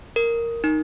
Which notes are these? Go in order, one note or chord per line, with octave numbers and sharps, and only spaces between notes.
A#4
D#4